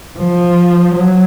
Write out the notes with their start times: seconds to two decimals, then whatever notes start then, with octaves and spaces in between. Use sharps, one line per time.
0.17 F3
0.95 F#3